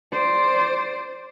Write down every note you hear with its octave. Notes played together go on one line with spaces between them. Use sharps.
C5 D5